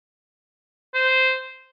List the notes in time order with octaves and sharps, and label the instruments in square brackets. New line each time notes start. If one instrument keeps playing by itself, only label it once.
[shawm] C5